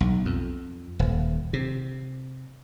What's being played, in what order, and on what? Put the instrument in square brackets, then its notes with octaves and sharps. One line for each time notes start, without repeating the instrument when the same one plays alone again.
[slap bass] B1
F2
D#1
C3